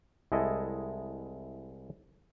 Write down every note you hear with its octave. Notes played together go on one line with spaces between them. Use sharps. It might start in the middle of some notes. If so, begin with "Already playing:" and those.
C2 G#3 E4 A4 D#5